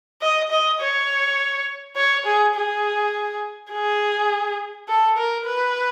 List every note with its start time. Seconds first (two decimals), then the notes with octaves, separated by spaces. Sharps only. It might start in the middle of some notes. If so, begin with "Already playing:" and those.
0.22 D#5
0.51 D#5
0.80 C#5
1.97 C#5
2.25 G#4
2.55 G#4
3.71 G#4
4.88 A4
5.17 A#4
5.46 B4